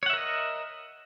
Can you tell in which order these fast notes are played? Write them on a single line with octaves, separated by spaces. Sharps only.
C#5 F#5 E5 A#4 D#5